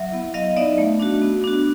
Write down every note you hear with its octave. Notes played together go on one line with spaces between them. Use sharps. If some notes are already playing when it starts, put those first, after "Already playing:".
Already playing: F#3 E5 F#5
B3 E4
F#3 D#5 F5
B3 D#4 D5 E5
A3
D4 F#4
B3
D4 F#4